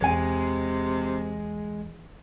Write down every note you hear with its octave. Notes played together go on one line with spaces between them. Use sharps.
E2 C3 G#3 C#5 G#5